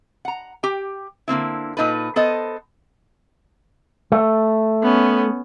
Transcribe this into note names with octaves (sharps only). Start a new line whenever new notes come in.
F#5 A#5
G4 G5
D3 A#3 C4 E4
A#2 D#4 A4 B4
B3 A4 C5 D#5
A3
B3 C#4